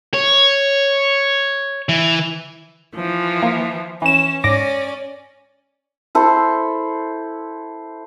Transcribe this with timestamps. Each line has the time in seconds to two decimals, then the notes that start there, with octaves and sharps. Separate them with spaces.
0.14 C#5
1.89 E3
2.94 E3 F3
3.42 A#3
4.02 E3 C#4 E7
4.44 G#2 C#4 D5 D6 A#6
6.15 E4 A4 C5